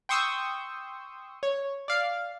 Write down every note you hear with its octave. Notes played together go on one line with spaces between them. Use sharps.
G5 C6 C#6 D#6 E6 G6
C#5
D5 F5